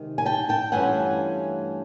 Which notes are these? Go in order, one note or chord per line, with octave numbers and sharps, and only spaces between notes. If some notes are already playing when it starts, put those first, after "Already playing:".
Already playing: C3 D#3 G#3
G#5
G5 A5
G5 A5
G2 E3 A3 C#4 F4 F#5 G#5